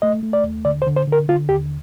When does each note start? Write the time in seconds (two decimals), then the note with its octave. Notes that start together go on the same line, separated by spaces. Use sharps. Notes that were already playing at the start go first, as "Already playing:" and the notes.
0.02 A3 D#5
0.23 A3
0.33 D5
0.44 D#2
0.65 D3 D5
0.82 C5
0.87 D3
0.96 C5
1.07 D3
1.12 A#4
1.28 D3 F4
1.49 D#2 G4